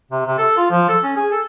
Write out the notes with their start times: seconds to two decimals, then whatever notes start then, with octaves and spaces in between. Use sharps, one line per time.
0.11 C3
0.26 C3
0.38 A4
0.57 F4
0.71 F3
0.89 A4
1.03 C#4
1.16 G#4
1.32 A4